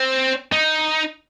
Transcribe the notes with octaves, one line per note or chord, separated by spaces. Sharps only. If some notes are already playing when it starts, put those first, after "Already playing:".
Already playing: C4
D#4